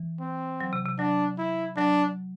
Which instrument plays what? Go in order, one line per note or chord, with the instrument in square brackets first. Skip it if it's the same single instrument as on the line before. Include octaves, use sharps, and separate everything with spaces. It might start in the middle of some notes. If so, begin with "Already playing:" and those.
Already playing: [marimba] E3
[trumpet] C4
[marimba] F#3
C3
C3
[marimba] F#3 [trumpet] D4
[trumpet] E4
[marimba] F#3 [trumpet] D4